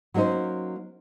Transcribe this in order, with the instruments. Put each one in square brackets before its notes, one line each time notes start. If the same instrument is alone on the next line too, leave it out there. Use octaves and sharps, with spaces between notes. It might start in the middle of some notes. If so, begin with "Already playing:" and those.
[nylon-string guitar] F#3 A#3 C#4 D#4 C5